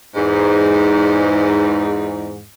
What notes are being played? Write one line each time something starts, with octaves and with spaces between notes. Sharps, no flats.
E2 G#2